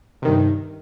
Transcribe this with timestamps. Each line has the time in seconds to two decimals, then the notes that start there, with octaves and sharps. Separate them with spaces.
0.22 C3
0.25 D#3
0.28 G2